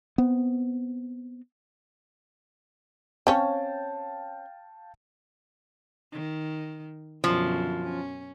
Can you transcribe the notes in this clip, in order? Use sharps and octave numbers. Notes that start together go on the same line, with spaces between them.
B3 C4
C4 C#4 C#5 F5 G5 A5
D#3
F#2 B2 D3 F3
C#4